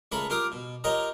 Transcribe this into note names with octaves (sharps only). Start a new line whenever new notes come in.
C#2 A3 A#4 B4 B5 C#6
F4 G4 A#4 F5 D6 D#6
B2
F4 G4 A#4 C#5 D#5 A#5